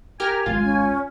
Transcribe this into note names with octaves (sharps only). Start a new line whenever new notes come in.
G4 A#4 G#5 F6
G#1 C#2 G#3 F4
C#4